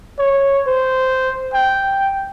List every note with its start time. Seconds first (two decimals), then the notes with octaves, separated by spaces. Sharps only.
0.19 C#5
0.67 C5
1.54 G5